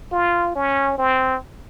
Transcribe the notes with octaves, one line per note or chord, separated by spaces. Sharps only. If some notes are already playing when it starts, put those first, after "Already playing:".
F4
C#4
C4